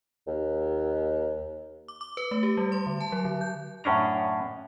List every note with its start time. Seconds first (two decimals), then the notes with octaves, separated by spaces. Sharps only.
0.27 D#2
1.88 D6
2.01 D6
2.17 B4
2.31 A3
2.43 G4
2.57 G3
2.72 C6
2.87 D3
3.00 A5
3.12 F#3
3.25 D3
3.41 G6
3.84 F#2 A2 C#4 D4 A#5